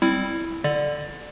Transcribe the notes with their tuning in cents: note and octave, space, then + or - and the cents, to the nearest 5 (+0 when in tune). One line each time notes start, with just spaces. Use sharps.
G3 +0 C4 +0 E4 +0
D3 +0 D5 +15